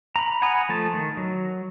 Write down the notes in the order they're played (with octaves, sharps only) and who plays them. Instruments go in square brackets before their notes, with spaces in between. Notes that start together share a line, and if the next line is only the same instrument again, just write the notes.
[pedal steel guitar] A#5 B5
F#5 G#5 A#5 B5 D#6
F3 A3 A5
D#3
F#3